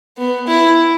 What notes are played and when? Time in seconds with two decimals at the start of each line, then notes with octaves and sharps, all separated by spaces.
0.18 B3
0.47 E4